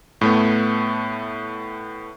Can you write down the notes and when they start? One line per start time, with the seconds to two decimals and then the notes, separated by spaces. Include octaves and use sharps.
0.21 A2 A3 B3